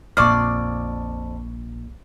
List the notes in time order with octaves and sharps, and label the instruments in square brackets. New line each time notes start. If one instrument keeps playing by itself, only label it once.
[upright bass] A#1 A#2 [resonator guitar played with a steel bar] F2 D5 [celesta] C#6 D6 F6